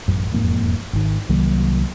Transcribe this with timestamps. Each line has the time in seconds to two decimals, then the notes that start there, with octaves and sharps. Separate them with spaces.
0.08 A1 F#2
0.32 E1 F2 G#2 A#3
0.93 G#1 D#3
1.29 C2 D#3 F#3 A#3